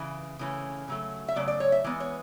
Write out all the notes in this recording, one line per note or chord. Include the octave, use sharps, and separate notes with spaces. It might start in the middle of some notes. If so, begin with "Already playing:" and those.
Already playing: C#3 E3
C#3 E3 A3 C#4
C#3 F#3 A3
E5
C#3 F#3 A3 D5
D5
C#5
E5
E3 G#3 B3
C#5